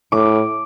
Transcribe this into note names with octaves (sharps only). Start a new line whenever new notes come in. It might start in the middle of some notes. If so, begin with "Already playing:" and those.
A2 D6